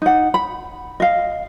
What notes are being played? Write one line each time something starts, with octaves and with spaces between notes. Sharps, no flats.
D#4 F#5
B5
D#5 F5